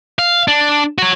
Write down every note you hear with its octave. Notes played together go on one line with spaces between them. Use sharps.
F5
D4
F#4 C#5